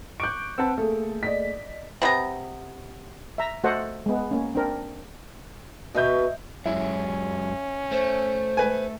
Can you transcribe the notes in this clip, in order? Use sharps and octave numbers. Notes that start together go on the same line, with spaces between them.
C#6 D6 F#6 G6 D7
C4 B4 F#5 A5 E6
A3 A#3 G#4 A4
D5 D#5 B6
C3 B3 E4 A#5
E5 A#5
A3 F#4 A4 C5 D#5 F#5
G#3 B3
A#3 C#4
C4 D4 A#4
B2 F#4 B4 D#5 E5 G6
F#2 F#3 G#3 C#4 E4
A3 C5
B4 G#5